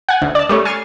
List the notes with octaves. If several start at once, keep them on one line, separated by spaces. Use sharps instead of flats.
F#5 G#5
D2
D5 A5
G3 A3 C#4
G#5 F6 A6 C7 C#7